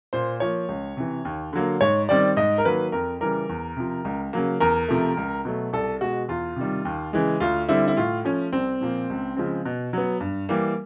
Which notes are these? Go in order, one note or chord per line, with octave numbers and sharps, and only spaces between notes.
A#2 C5
F3 A#3 C#5
C#2
C3 E3
D#2
D3 F#3 A#3
G#2 C#5
D#3 G3 C4 D5
G#2 D#5
A#4
D#3 F#3 A#3 B4
F2 A#4
C#3 E3 G3 A#4
E2
C3 F3
C#2
C#3 F#3 A#3
E2 A#4
C3 F3 A3
C#2
B2 F#3 A3
C2 A4
B2 G#3 F#4
E2 F4
C3 D#3 G3
D#2
C#3 E3 G#3
D2 F4
D3 G3 C4 E4
E4
A2 F4
F3 A3 C#4
C2 C4
A#2 F3 A#3
C#2
C#3 F3 G#3 C4
B2
F#3 B3
G2
E3 G3 A#3